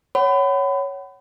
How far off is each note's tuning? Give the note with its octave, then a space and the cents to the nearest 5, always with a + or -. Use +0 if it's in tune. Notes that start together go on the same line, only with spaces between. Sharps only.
C#5 +0 F#5 +30 B5 +30